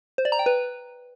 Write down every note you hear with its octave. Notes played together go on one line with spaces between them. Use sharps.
C5
D5
A#5
G5
B4